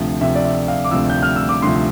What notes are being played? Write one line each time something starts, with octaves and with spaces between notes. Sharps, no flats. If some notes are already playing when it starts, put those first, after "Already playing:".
Already playing: D2 C3 F3
D2 C3 F3 E5
D5
E5
F5
D6
D2 C3 F3 E6
G6
F6
E6
D6
D2 C3 F3 C6